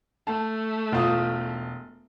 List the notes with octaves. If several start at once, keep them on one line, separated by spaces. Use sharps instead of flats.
A3 A5
E1 F4 D#6